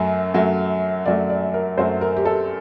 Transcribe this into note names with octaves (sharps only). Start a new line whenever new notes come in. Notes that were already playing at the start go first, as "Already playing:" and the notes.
Already playing: F#2 F#3 A3
F#2 F#3 A3
F#2 F#3 A3 D5
D5
A#4
F#2 F#3 A3 C5
A#4
G4
A4